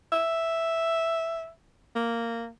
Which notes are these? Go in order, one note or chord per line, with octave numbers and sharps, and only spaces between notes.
E5
A#3